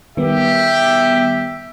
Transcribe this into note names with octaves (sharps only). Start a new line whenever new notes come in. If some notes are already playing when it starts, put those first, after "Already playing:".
D#3 G3 B3 G4 E5